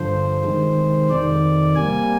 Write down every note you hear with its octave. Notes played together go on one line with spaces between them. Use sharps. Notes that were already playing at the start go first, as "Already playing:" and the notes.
Already playing: G2 D3 F3 C5
C3 D#3 G#3
F2 C3 D#3 D5
C3 G3 A#3 G#5